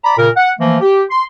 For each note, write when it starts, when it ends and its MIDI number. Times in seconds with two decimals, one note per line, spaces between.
0.04 0.17 74
0.04 0.17 82
0.04 0.17 83
0.18 0.29 46
0.18 0.29 49
0.18 0.29 70
0.37 0.51 78
0.60 0.78 52
0.60 0.78 53
0.60 0.78 57
0.60 0.78 58
0.81 1.02 67
1.10 1.25 84